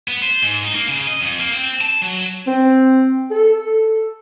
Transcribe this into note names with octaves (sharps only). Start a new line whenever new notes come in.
B3
C5
G#2
D#4
A#3
C#3
D#5
F2
A#3
C4
A5
F#3
C4
A4
A4